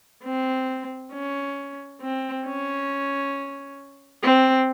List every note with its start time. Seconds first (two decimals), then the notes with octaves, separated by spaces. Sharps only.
0.24 C4
1.13 C#4
2.02 C4
2.46 C#4
4.23 C4